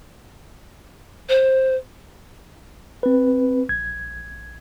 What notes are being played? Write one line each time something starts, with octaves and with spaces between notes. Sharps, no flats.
C5
C4 B4
A#1 G#6